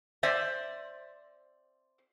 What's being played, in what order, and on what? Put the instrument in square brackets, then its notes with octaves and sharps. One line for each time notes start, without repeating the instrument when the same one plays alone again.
[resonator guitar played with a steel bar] C4 C5 D5 E5